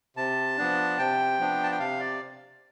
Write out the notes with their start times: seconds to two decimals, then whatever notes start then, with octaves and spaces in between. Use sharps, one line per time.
0.17 C3 A5
0.57 F3 B3 D4
0.98 C3 G5
1.39 F3 B3 D4
1.64 A5
1.71 G5
1.79 C3 F5
2.00 D5